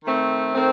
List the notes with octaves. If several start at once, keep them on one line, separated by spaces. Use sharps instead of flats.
D#3 A3 C4
D#3 A3 C4